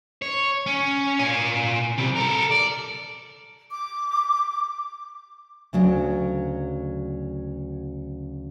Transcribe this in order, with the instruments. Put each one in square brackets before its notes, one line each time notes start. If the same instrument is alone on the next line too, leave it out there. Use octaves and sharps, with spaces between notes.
[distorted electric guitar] C#5
C#4
A#2 G#5
C3 G3
A4 A#4
D5
[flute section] D6
[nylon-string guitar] D2 C#3 F#3 D4